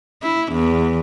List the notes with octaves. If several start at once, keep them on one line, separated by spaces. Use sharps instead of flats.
E4
E2